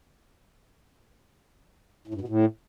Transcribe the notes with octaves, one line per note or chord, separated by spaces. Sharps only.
A2
G2
B2
A2